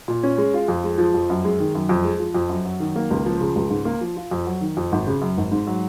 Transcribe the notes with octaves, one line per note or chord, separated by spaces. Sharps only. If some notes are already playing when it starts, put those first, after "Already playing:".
A#2
C#4
G#3
F4
F2
G#3
F3
F2
F#2
G#3
D#3
F#2
F2
G#3
F3
F2
F#2
F#3
D#3
A#3
C#2
F3
C#3
C#2
G#2
A#3
F3
F4
F2
F#3
D#3
F2
G#1
C#3
F#2
G#1
G#2
F#3